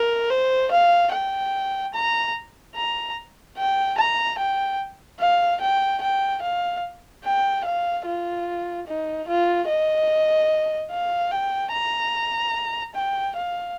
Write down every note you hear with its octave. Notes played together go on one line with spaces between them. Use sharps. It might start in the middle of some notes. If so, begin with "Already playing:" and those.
Already playing: A#4
C5
F5
G5
A#5
A#5
G5
A#5
G5
F5
G5
G5
F5
G5
F5
F4
D#4
F4
D#5
F5
G5
A#5
G5
F5